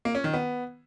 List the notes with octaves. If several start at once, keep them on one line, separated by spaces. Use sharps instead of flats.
A#3
C#4
D#3
B3